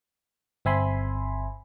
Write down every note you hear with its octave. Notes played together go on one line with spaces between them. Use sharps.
G1 C4 E5 G#5 B5 C6